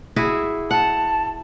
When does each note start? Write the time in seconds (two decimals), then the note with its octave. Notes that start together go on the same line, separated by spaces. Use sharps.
0.16 E4 F#4 G#4
0.71 F#5 A5